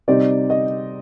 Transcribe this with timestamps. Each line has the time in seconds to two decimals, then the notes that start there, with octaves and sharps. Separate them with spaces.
0.08 C3 G3 C4 D#4 D5
0.50 D#5